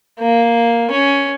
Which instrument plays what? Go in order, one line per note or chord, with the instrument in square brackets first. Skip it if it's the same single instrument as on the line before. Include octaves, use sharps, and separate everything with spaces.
[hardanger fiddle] A#3
C#4